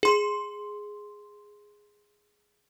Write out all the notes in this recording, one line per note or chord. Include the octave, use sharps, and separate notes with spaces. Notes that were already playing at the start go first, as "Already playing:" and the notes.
G#4 C6